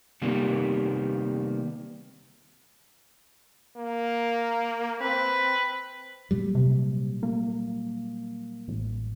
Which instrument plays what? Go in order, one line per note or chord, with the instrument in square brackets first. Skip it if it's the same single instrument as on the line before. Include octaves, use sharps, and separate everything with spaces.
[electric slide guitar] C3 D#3 G3 A#3 B3
[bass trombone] A#3
[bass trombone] C4 [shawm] B4
[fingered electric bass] A#2 F#3 G3
[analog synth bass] C3
A#3
A1